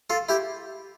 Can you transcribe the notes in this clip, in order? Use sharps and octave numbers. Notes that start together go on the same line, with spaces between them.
F4 A4
E4 G4